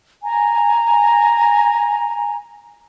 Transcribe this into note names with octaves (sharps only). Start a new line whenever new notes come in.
G#5 A#5